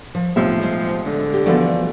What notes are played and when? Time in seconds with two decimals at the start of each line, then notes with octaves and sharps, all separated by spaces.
0.15 F3
0.36 B1 A2 C3 F3 E5
0.63 G#3
1.06 D3
1.33 G4
1.46 B2 E3 F3 A3 F#4 D5